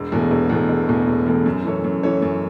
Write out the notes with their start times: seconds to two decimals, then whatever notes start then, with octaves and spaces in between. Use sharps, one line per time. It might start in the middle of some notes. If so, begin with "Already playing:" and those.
Already playing: E1
0.12 E2 B2 A3
0.31 E1
0.50 E2 B2 A3
0.69 E1
0.88 E2 B2 A3
1.08 E1
1.26 E2 B2 A3
1.46 F#2
1.65 E3 C#4 A4 C#5
1.84 F#2
2.03 E3 C#4 A4 C#5
2.22 F#2